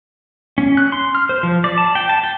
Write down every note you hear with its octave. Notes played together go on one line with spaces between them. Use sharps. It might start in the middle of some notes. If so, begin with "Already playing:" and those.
C#4
F#6
C6
F6
C5
F3
D5
A5
G5
A5
G5